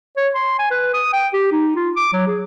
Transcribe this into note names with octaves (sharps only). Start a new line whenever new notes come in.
C#5
C6
G#5
B4
D#6
G5
G4
D#4
F4
D6
F#3
G#4